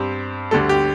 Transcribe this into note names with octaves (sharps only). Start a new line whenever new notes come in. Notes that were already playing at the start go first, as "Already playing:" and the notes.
Already playing: G2 G3 C4
D2 D3 G3 A4
G4